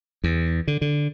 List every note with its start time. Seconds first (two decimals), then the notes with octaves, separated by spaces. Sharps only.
0.24 E2
0.68 D3
0.81 D3